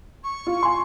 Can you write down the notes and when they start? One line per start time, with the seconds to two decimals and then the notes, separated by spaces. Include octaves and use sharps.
0.23 C#6
0.47 F4
0.63 G#5 C6